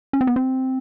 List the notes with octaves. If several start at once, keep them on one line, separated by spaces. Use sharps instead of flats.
C#4
C4
B3
C4